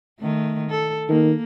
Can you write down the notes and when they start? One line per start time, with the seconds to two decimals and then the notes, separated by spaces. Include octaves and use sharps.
0.20 D#3 A3
0.70 A4
1.09 D#3 A#3